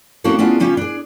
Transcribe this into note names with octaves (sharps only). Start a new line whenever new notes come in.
A#3 C4 C#4 E4 F#4 A4
B3 C#4 D4 F4 G#4
C#3 G3 C#4 F4 G4
D4 G#4